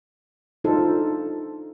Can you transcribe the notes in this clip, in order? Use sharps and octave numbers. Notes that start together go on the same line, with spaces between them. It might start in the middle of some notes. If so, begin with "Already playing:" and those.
D4 D#4 F4 A4 C5